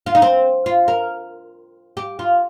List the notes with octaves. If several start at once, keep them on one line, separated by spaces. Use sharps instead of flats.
F4
D#4
C4
F4
A#4
G4
F4